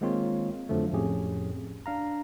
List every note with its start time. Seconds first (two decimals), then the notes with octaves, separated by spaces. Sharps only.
0.01 D#3 G#3 A#3 C4 F4 C#5
0.69 F2 D3 F3 F#3 A3
0.93 F2 A2 C#4 G4 G#4
1.86 D4 F5 A#5